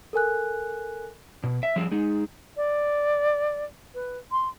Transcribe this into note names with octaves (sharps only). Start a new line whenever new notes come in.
A4 A#4 G#5 F#6
B2
E5
F3 G3 C4 G#4
G#3 D#4 G#4
D5
B4
C6